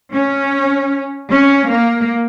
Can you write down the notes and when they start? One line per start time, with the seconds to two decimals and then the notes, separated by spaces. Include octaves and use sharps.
0.14 C#4
1.29 C#4
1.67 A#3